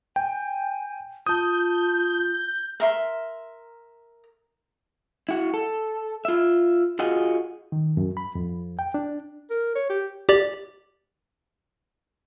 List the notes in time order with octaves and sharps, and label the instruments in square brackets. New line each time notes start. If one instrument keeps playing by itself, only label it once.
[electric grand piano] G5 [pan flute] G#5
[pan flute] F4 [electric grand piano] A5 D#6 [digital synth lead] G6
[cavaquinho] A#4 E5 C6
[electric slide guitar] E4 F#4
A4
F4 E5
F4 F#4 G#4 D#5
[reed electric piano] D#3
F#2
B5
F2
G5
D4
[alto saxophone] A#4
C#5
G4
[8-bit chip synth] G4 D5